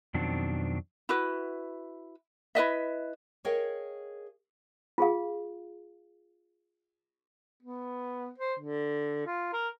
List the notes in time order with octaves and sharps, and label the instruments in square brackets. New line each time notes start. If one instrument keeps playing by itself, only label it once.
[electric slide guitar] F2 B2 D#3 F#3 C4 D4
[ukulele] E4 F#4 B4
E4 B4 D#5 E5
[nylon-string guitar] G#4 A#4 C#5 D#5 F5 G5
[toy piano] F4 G#4 F5
[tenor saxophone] B3
C5
D3
F4
A#4